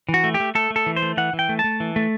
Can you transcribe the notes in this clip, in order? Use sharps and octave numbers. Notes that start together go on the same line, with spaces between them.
E3
F#4
A3
G4
A3
A3 A4
A3
A4
E3
C5
A3
E3 F#5
E3
G5
A3
A5
A3
E3
A3